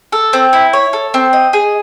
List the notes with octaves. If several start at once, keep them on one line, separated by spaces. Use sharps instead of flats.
A4
C4
E4
C#5
A4
C4
D#5
G#4